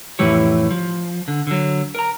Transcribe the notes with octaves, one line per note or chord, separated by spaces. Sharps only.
F2 A2 E3 E4 G4 C#5
F3
D3
D3 F#3
A#4 A#5